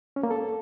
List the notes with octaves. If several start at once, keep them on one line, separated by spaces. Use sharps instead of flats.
C#4
A#3
A4